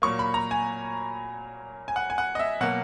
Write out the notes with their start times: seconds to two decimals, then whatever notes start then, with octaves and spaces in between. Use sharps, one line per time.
0.02 A#2 F#3 A#3 C#6
0.19 B5
0.34 A#5
0.51 G#5
1.88 G#5
1.96 F#5
2.10 G#5
2.18 F#5
2.35 D#5
2.39 E5
2.61 B2 F#3 A#3 F#5